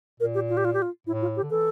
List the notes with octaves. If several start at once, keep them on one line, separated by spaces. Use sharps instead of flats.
A#2 A#4
G4
F4
G4
F4
G4
F4
A2 E4
F4
G4
D3
E3 A4